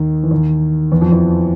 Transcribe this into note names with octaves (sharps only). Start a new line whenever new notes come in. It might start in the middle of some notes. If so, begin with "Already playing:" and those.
Already playing: D#2 D#3
E3
D#2 D#3
E2 E3
F2 F3
E2 E3